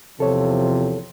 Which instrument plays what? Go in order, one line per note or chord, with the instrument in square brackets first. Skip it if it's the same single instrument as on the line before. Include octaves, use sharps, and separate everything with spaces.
[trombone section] E2 C3 F3 [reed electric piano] A4 C#5